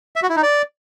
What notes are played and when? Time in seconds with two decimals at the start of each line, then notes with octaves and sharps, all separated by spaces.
0.16 E5
0.23 F#4
0.29 E4
0.36 D#4
0.43 D5